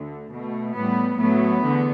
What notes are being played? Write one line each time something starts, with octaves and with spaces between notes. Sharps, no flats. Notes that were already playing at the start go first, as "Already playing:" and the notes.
Already playing: D2 D3 A3
B2 A3
A2 G3 B3
A2 F#3 A3 B3
E2 D3